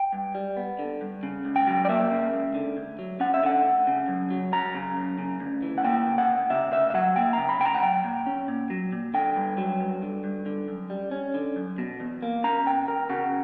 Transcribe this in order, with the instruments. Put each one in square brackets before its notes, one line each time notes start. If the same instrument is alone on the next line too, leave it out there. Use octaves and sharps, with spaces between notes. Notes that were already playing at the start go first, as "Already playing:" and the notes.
Already playing: [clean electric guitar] G5
G2
G3
B3
D3
G2
C#3
C#2
G5
F#3
D5
A#3 E5
C#3
C#2
D3
D2
F#3
C#4 F#5
E5
D3 F#5
D2
C#3
F#2
F#3
F#2 A#5
C#3
F#2
C#3
D2
E3
F#5
A#3 G5
C#3
F#5
D2
C#3 E5
D2 E5
E5
F#3 F#5
A#3 G5
C#3 A#5
B5
D2 G5
A#5
F#5
F#3 G5
A#2
C#4
A#2
F#3
A#2
D3 G5
G2
F#3
G2
D3
G2
D3
F#2
G3
C#4
D3
F#2
B2
E2
A#3
C#4 A#5
B2 G5
E2 A#4
C#3 F#4